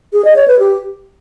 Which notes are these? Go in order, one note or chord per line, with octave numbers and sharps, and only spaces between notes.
G#4
D#5
C#5
B4
G4